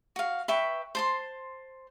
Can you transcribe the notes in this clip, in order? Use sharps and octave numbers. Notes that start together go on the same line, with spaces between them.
F#4 F5
B4 E5 G5 C#6
C5 A5 C6